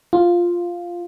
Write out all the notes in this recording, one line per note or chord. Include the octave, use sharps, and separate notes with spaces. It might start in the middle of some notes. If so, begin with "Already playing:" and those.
F4